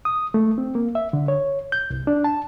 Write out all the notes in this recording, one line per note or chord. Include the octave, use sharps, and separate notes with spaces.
D#6
A3
C4
A#3
E5
D3
C#5
G6
C2
D4
A5